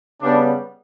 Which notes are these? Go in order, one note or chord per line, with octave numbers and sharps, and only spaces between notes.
C#3 G3 B3 D4